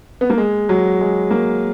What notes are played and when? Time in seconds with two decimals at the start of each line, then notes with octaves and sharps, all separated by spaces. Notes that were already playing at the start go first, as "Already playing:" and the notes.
0.21 B3
0.30 A#3
0.38 G#3
0.69 F#3
1.01 G#3
1.31 A#3